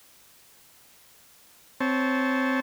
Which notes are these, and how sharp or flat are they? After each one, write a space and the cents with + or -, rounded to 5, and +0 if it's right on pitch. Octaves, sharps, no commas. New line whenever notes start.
C4 -10 C#5 +0 A5 -20